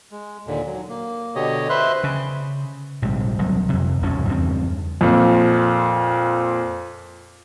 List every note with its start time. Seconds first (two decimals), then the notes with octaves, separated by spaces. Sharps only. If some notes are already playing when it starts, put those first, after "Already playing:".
0.11 G#3
0.47 D#2 A#2 D3
0.66 F#3
0.89 A#3
1.35 B2 D3 G4 C#5 D#5
1.69 B4 C5 E5 C6 F#6
2.04 C#3
3.02 A#1 G#2 C3 G3
3.38 D#1 C2 F#3
3.69 F2 C3
4.02 E1 C2 A2 C#4
4.27 E2 G2 C#3 C4
5.01 F2 A#2